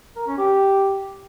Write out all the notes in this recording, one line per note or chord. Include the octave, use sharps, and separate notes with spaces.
A#4
C#4
G4